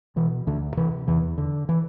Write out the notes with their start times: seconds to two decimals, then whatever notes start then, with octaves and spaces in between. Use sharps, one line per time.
0.16 B2 E3
0.47 D2 D3
0.77 C3 E3
1.08 E2 E3
1.38 D3
1.69 E3